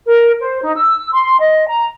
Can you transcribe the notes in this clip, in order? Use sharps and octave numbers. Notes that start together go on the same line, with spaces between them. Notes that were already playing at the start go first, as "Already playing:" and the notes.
A#4
C5
D#4
E6
C6
D#5
A#5